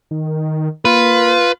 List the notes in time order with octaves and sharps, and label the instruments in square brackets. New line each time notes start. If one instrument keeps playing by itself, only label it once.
[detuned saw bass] D#3
[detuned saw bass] A#3 [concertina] F4 [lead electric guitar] B4